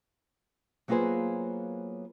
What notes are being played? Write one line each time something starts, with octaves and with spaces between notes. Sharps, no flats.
F#3 A#3 B3 F4 G#4 C5